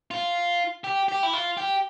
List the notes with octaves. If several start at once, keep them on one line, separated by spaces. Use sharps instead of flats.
F4
G4
G4
E4
F4
G4